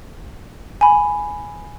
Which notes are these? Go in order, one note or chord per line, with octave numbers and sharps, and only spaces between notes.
G#5 B5